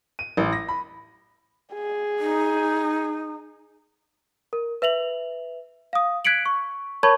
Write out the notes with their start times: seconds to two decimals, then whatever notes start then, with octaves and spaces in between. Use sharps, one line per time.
0.19 D#7
0.37 A1
0.53 A#6
0.68 B5
1.73 G#4
2.19 D#4
4.53 A#4
4.82 B4 E5 F7 F#7
5.93 F5 D#6
6.25 F#6 G#6 B6 C#7 D7 F#7
6.46 C#6
7.03 A#4 C#5 A5 B5 C#6 G#6